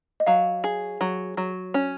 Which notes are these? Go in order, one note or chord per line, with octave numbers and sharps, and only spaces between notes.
D#5
F#3 F5
G#4
F#3
F#3
C#4